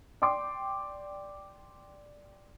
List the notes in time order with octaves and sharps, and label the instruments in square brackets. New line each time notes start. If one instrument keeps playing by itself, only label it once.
[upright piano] D5 G5 C6 D6